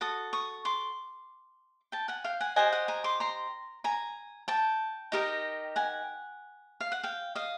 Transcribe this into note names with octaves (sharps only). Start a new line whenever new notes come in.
F#4 A4 D#6
C#6 D#6
C6 D6
G5 A5
F#5 G#5
F5 G5
F#5 G#5
G4 C5 D#5 F#5 G#5
F#5 G#5
G#5 A#5
C6 D6
A#5 C6
G#5 A#5
G5 A5
D#4 G4 A#4 D#5
F#5 G#5
F5
F#5
F5 G5
D#5 F5